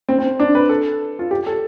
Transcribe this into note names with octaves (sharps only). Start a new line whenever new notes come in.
C4
C4
D4
B4
A4
F4
G4
A4